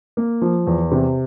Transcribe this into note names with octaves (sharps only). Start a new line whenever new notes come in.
A#3
F3
E2
C3